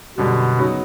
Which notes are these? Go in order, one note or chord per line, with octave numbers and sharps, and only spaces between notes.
F#2 B2 D3 G3
C#3 F#3 B3 D#4